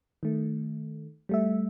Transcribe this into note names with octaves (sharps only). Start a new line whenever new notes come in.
D#3 A3
G3 A3 E5